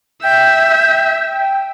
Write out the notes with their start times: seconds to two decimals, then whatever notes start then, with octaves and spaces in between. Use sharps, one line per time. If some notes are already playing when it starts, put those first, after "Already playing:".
0.23 E5 G5 G6